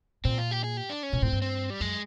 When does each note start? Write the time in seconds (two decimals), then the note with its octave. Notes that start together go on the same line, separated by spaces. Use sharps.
0.25 A#2 C4
0.38 F4
0.51 G4
0.64 G#4
0.77 G4
0.90 D4
1.03 C#4
1.13 A#2
1.22 A2 C4
1.32 G2
1.42 C4
1.70 G3
1.80 F#2 G#3